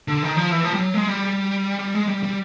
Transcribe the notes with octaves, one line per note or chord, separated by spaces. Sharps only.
D3
D#3
F3
E3
F3
G3
F#3
G#3
G3
G3
G#3
G3
G3